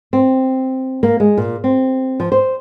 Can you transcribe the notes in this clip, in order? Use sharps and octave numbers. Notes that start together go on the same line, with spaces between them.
C4
A#3
G#3
A#2
C4
F3
C5